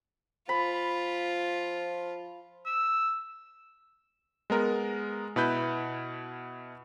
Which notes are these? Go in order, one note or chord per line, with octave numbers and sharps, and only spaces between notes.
F3 F4 B5
E6
G#3 B3 A#4
B2 E4 B4 G6